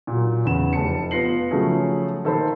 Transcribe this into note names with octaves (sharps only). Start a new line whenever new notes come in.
A#2 F#3
E2 C#3 E7
F1 A5 C#7
B3 F4 A#6 C7 F#7
C#3 F3 F#3 A3 C#4 G#4
D#3 A#3 A4 C5 B5 E6